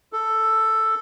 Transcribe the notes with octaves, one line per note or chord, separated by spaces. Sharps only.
A4